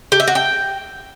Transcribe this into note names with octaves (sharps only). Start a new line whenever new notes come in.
G4
E5
F#4
G5